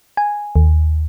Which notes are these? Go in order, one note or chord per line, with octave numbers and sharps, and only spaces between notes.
G#5
D#2